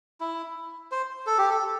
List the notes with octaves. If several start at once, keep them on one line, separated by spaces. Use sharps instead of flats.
E4
C5
A4
G4
A4